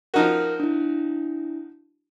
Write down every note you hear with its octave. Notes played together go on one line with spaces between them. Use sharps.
F3 D#4 F#4 A#4 F6
D4 E4